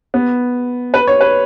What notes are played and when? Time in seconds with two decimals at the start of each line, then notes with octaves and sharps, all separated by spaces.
0.14 B3
0.94 B4
1.07 C#5
1.21 B4